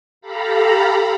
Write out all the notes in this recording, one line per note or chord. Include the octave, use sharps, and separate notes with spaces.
G4 A4 F5 A#5 B5